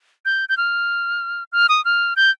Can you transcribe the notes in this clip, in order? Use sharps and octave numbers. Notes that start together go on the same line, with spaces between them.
G6
G6
F6
F6
D#6
F6
G6